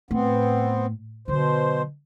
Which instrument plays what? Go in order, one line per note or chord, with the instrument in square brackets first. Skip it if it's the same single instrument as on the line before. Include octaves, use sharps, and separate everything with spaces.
[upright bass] A2 [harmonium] B3 C4
[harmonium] B2 C5 [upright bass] D3 F#3